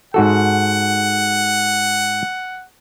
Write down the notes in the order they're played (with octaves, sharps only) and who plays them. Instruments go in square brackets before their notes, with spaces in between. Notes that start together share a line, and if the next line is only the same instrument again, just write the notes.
[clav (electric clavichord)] G#2 F#4 A4 [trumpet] F#5